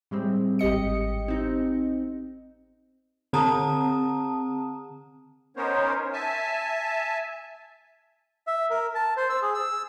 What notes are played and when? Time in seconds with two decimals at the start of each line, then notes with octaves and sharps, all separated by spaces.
0.11 A2 G3 G#3 C4
0.59 G#1 G4 D#5 C#7
1.28 C4 D#4
3.33 D3 C4 A5 A#5 D#6
5.57 B3 C#4 D#4 A#4 C5 C#5
6.13 E5 G#5 A5
8.47 E5
8.70 A#4
8.95 A5
9.17 C5
9.29 E6
9.42 G#4
9.54 E6